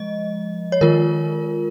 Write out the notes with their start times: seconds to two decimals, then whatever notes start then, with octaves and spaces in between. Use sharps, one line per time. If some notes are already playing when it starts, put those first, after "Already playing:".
Already playing: F3 G#3 D#5
0.72 C#5
0.81 D#3 G#3 F4 A#4